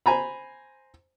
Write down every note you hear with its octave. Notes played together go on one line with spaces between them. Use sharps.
C5 G#5 A#5 B5